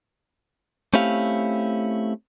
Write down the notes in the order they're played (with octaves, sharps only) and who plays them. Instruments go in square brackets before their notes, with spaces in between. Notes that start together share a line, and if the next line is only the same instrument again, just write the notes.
[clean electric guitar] A3 C4 C#4 E4 G4 F5